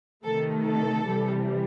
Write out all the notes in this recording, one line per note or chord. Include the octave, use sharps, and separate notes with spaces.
C3 D#3 A3 A4
A4
C3 E3 G3